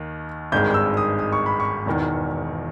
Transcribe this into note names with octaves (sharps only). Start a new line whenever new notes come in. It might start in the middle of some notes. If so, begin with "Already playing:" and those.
Already playing: D#2 D#3
G#1 G2 D#3 G#3 G6
G6
E6
D#6
D#6
C#6
B5
C#6
E1 E2 D#3